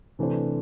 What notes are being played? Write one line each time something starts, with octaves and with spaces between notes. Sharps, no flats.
C3 E3 A3 D4 C5